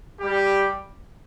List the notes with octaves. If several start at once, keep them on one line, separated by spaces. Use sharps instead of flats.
G3 G4